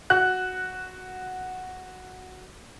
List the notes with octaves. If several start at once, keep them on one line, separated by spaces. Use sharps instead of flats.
F#4 F#6